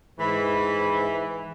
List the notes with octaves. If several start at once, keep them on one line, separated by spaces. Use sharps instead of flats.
G#2 E3 B5